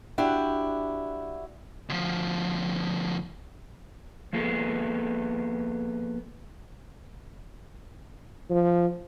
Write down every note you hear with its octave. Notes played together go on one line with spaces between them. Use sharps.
D4 E4 F#4 G4
D2 F3
F3 A#3 B3 G#4 A4
F3